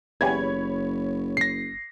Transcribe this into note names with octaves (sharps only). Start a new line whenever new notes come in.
F#1 E2 G4 C#5 G#5 B5 G#6
A#6 C7